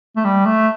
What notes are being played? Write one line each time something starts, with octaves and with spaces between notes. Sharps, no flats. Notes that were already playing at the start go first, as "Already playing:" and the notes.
A3
G3
A3